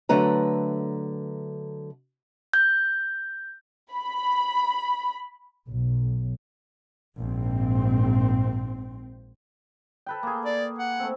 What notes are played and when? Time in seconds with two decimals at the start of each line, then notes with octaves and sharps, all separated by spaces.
0.09 D3 F#3 A3 B4 A#5
2.53 G6
3.93 B5
5.68 B1
7.18 A#1 G#2 C4
10.06 A4 B4 G5
10.23 A#3 G#4
10.45 D5
10.79 F#5
10.99 A3 C4